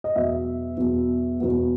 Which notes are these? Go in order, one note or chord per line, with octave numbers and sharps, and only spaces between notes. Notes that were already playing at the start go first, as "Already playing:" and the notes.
D#5
E2 B2 F#3 B3 E5
E2 B2 F#3 B3
E2 B2 F#3 B3